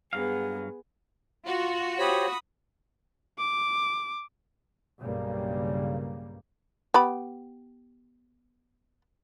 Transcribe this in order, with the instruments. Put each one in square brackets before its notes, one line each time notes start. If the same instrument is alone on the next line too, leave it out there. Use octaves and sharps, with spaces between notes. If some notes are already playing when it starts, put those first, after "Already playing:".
[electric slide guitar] G2 F#3 F5 [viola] B3 G#4
[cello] F4 [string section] F#4
[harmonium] G4 C5 C#5 [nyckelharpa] B5 D#6
[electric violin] D6
[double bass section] B1 G2 C#3 G3 A#3
[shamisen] B3 G4 B5